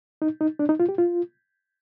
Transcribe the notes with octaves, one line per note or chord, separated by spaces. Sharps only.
D#4
D#4
D4
D#4
F4
G4
F4